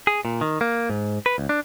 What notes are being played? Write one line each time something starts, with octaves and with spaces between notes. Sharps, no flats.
G#4
A#2
D#3
A#3
G#2
B4
C#2
D4